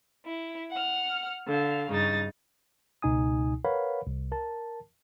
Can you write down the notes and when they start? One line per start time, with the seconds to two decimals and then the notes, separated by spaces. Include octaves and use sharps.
0.24 E4
0.72 F#5 F6
1.47 D3 F5
1.90 G2 C#3 D#4 A6
3.02 C#2 B2 D#4 G#5 D#6
3.65 A#4 B4 C#5 F5 F#5 B5
4.07 C2
4.32 A#4 A5